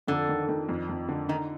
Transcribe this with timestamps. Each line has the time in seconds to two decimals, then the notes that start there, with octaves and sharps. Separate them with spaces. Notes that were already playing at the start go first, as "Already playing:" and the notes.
0.08 F2 D3
0.29 D#3
0.49 D#3
0.69 F2
0.89 F2
1.09 D3
1.29 D#3 D#4